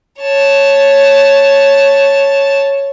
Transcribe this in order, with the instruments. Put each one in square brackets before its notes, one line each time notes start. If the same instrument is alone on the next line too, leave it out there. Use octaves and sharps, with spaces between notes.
[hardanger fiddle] C#5 A5